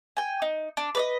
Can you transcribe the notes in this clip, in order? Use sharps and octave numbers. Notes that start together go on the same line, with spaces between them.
G5 G#5
D#4
D4
B4 D5 D#5